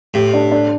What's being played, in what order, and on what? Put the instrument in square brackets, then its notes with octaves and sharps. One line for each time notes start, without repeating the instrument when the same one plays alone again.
[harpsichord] A2 [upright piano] G4
[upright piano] D4
D4